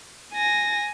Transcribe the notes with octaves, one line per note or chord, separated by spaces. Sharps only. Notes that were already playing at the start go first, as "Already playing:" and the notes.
G#5 A#6